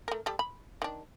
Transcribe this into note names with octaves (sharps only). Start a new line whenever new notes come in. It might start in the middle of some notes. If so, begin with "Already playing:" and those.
A3 A#4
G3 A4
B5
D#3 D4